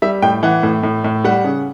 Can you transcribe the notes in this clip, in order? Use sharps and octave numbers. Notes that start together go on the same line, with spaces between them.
G3 E5
A2 G5
E3 F#5
A2
A2
A2
G3 F#5
C#3